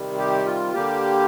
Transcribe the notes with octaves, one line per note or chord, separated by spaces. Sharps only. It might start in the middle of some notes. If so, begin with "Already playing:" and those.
Already playing: C3 D#3 G3
G4
F4
D3 G3 A#3 G4